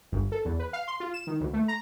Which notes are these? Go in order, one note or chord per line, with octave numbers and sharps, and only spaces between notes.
G1
A4
E2
B4
F5
C6
F4
E7
D#3
D2
A3
A#5